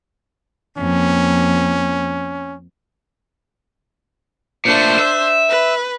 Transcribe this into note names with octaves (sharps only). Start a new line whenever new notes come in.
F2 A#3 C#4
A#2 A3 D4 C5
E5
B4